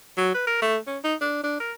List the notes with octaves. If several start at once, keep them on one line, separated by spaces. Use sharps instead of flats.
F#3
B4
A#4
A3
C#4
D#4
D4
D4
A#4